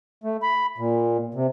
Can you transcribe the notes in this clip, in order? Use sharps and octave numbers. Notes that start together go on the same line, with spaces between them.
A3
B5
A#2
C3